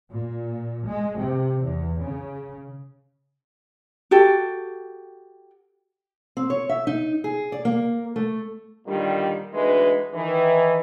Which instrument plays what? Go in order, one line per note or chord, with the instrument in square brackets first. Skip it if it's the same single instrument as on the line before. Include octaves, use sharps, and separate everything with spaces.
[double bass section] A#2
G#3
C3
E2
C#3
[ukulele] F#4 G4 A4 G5
[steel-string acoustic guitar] C4
C#5
E5
D#4
G#4
D5
A#3
A3
[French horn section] A#2 D3 D#3 G3
D2 E3 G#3 D#4 B4
D#3 E3